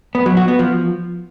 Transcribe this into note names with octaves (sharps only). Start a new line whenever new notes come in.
B3
F#3
F#4
B3
F3